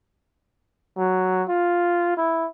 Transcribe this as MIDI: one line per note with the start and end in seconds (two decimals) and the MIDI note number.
0.98 1.43 54
1.49 2.15 65
2.16 2.46 64